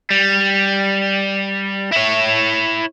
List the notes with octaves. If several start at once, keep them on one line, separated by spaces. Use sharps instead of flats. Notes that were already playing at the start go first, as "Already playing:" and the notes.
G3
E4 C#5